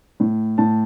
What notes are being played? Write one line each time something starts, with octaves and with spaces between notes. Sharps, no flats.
A2
A2 A5